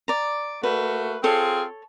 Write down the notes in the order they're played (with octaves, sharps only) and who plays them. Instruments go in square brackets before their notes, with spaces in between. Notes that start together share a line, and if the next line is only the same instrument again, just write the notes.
[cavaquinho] D5 A#5
[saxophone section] A3 A#3 F#4 [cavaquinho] B4
[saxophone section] C4 F4 G#4 [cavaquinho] A4 C#5